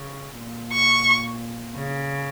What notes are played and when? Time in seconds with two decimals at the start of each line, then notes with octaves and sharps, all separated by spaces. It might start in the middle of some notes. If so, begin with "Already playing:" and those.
Already playing: C#3
0.39 A#2
0.73 C#6
1.76 C#3